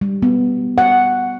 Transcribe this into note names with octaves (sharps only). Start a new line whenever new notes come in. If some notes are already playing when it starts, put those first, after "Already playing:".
G3
B3
F#5